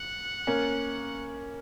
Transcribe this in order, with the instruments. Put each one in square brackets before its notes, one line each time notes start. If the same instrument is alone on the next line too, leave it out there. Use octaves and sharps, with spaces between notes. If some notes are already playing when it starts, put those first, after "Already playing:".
Already playing: [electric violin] F#5
[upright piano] A#3 C#4